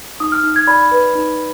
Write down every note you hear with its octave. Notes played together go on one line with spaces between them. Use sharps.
D#4 D#6
F6
D#4
G#6
D5 B5
B4
D#4